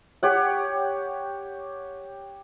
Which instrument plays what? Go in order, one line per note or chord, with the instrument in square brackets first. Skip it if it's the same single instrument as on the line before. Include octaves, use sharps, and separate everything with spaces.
[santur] G4 C#5 F#5